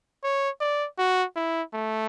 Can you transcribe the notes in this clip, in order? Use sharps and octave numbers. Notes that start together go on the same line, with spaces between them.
C#5
D5
F#4
E4
A3